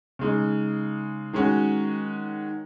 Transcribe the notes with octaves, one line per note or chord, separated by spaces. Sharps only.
C#3 G#3 D#4
D#3 G#3 C#4 F#4